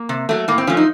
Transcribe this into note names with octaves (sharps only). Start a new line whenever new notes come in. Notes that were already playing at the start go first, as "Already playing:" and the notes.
Already playing: A#3
C3
F#3 A3
A2 A#3
C4
F3 A3 C#4
D#4